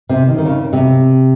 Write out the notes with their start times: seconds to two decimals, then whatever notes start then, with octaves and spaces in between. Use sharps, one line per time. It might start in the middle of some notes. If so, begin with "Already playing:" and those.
0.09 C3
0.28 D#3
0.38 D#3
0.45 C#3
0.73 C3